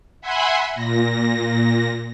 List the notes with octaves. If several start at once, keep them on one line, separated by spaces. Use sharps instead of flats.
E5 F#5 G#5 B5 C6
A#2 A#6